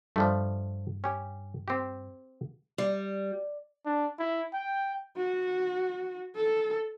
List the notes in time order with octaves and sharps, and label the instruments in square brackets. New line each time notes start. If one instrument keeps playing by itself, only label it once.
[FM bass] G2 [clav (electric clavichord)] F3 G3 A3
[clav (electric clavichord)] C#4 G4
C4 G4
[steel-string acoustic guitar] G3
[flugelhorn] D4
E4
G5
[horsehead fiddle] F#4
A4